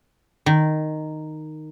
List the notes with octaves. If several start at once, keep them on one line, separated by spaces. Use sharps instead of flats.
D#3